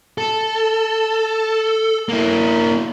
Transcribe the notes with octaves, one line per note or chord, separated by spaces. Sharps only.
A4
A#3 E4